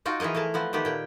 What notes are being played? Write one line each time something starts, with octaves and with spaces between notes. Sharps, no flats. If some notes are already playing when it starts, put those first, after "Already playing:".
D#4 F4 F#4 G5
E3 F3 G#4 A#4 D#5
A3 E4 A#4 A5
F3 B3 C4
D#3 A3 B3 G4
A#2 G5